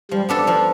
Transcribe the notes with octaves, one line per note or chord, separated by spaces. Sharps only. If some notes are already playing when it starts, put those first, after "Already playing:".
F3 G3
B3 D4 A4
F3